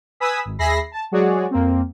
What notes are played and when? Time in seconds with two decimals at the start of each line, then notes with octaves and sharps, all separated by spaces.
0.20 B4 G#5 B5 D#6 E6 B6
0.45 G#1
0.59 D#2 G#4 E5 B5 A#6 C7
0.92 A5
1.11 F#3 G#3 F#4 G#4 C#5 D5
1.51 F2 A#3 C4